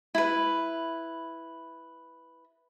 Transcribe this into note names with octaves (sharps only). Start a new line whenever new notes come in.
E4 B4